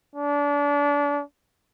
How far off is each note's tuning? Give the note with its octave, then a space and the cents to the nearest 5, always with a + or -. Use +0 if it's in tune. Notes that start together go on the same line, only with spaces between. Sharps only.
D4 -30